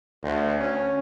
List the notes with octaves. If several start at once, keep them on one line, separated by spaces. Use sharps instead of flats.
D2
C#4